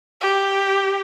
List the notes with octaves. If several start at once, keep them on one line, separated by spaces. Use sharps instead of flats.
G4